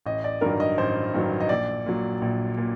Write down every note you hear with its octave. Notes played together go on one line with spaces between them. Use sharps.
A1 D#5
D5
G2 D#3 F#3 A#4
D#5
A1 C5
G2 D#3 F#3
D#5
A#1 D5
A#2 F#3
A#1
A#2